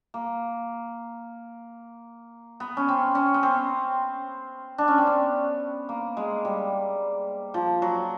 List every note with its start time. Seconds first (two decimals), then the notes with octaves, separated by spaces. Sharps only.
0.14 A#3
2.60 B3
2.77 C#4
2.88 C4
3.15 C#4
3.34 B3
3.43 C4
4.78 D4
4.88 C#4
4.98 C4
5.07 B3
5.89 A#3
6.17 G#3
6.45 G3
7.54 F3
7.82 F#3